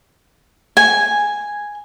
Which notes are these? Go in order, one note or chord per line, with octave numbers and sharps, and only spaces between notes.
G#5